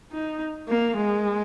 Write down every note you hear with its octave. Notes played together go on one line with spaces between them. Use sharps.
D#4
A#3
G#3